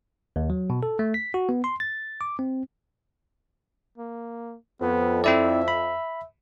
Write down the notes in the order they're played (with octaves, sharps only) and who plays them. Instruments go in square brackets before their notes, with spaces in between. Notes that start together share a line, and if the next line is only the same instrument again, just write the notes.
[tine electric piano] D#2
F#3
B2
A4
A3
B6
F#4
B3
C6
A6
D6
C4
[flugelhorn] A#3
[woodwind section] F2 [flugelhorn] B3
[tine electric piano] C4 E4 D5 [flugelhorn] E5
[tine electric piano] B5